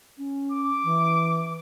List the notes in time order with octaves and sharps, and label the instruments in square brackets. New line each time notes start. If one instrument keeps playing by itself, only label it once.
[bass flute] C#4
[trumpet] D6
[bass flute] E3